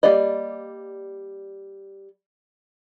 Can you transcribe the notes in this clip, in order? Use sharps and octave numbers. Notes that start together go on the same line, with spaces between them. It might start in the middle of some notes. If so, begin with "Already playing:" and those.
G3 A#3 G4 D5 D#5